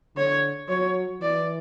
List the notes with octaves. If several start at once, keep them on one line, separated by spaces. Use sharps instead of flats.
D3 C#5
F#3 C#5
E3 D5